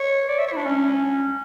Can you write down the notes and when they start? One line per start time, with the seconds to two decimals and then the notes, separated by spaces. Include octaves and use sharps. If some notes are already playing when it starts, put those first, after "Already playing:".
Already playing: C#5
0.29 D5
0.39 E5
0.47 C#5
0.52 E4
0.56 D4
0.66 C#4